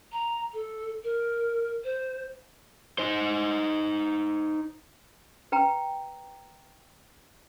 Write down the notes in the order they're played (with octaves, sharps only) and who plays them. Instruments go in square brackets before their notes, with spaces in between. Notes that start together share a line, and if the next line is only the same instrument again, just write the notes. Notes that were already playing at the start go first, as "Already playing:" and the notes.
[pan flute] A#5
A4
A#4
C5
[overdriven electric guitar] D#4 C5
[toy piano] B4 G5 A#5